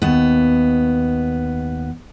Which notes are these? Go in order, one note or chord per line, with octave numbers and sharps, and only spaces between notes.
D#2 B3